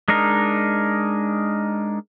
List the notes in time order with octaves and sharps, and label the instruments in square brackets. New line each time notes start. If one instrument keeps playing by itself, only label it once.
[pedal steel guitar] G#3 D4 D#4 A#4